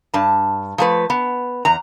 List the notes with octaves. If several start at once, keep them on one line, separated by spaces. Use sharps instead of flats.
G2 A5
F3 A3 B4
B3
E2 A#5